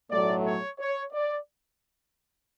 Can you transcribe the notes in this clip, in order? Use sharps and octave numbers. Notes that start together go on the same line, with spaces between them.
B1 A2 F#3 A3 D5
C#5
C#5
D5